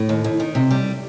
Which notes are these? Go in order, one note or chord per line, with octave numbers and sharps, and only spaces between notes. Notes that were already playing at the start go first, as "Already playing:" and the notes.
Already playing: A2
D#2
D#2
D#3
C3
G3